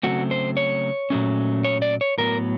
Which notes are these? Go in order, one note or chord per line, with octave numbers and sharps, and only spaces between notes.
C#3 F#3 A3 C4 F#4
C5
C#5
A#2 F#3 A3 C#4
C#5
D5
C#5
A2 F#3 B3 A#4